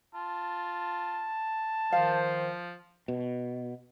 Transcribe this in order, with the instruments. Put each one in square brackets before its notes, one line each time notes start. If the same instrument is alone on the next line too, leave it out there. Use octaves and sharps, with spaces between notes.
[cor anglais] F4 [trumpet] A5
[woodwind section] D#3 C5 [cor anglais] F3 [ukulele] F5
[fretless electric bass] B2